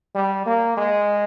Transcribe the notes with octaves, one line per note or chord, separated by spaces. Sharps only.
G3
A#3
G#3